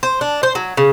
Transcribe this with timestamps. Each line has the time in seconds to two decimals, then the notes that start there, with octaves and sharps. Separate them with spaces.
0.03 C5
0.21 D4
0.43 C5
0.55 F#3
0.77 C#3